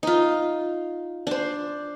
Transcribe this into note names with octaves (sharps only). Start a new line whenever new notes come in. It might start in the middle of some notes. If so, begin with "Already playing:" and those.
D#4 F4
D4 C5